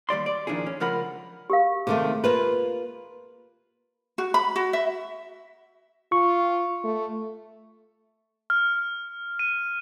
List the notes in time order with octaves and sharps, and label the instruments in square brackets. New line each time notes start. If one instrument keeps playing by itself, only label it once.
[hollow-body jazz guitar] D#2 G3 D5 C6
D5
A#2 D#3 F3 D4 E4 G#4
C#4
C#2 F3 F4 A#4 F#5 B5
[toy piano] G4 A#4 F5
[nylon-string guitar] C3 D#3 A3 [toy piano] G#4
[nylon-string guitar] A#3 F4 B4
[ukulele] F#4
B5
F#4
E5
[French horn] F4 [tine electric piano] C#6
[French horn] A3
[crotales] F6
D#7